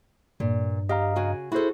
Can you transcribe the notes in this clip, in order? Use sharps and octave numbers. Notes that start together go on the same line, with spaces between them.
G2 A#2
G4 D#5 F5 A#5
C#3 F#4 G#5
E4 F#4 G#4 A4 C5